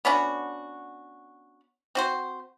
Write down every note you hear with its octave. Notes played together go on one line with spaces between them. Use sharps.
B3 C#4 D4 F#4
C4 F#4 C5